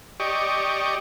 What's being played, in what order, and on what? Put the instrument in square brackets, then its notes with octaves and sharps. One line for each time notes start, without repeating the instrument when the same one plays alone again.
[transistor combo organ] G4 D5 D#5 C#6